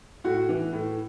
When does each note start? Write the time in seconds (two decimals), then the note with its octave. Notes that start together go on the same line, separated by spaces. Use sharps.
0.24 A2 F#4
0.49 E3
0.73 A2